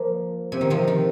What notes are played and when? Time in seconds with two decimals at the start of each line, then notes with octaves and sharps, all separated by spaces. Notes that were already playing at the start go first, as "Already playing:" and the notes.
Already playing: F3 A#3
0.52 C3
0.61 D#3
0.70 C3 F3
0.88 D#3